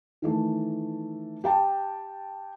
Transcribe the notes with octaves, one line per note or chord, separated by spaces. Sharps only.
D#3 E3 A3
G4 G5 A5